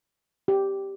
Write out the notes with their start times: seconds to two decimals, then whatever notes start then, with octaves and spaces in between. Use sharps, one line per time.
0.48 G4